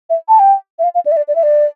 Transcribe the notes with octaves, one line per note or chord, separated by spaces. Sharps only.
E5
A5
G5
E5
F5
F5
D5
E5
D5
D5
E5
D5